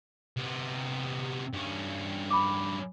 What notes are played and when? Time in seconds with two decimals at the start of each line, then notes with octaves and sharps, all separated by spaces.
0.37 C3 B3
1.53 G2 C#4
2.31 B5 D6